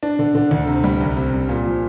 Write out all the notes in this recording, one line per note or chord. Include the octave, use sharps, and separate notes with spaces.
D4
D3
D3
D2
C3
G3
C2
C3
C2
A#2
F3